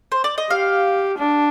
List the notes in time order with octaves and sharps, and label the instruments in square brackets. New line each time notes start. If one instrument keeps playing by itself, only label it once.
[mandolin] C5
D5
D#5
[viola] G4 [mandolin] F5
[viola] D4